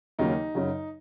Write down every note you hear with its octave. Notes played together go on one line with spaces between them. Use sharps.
D#2 C#3 F#3 A#3 D#4
F#2 C#3 F#3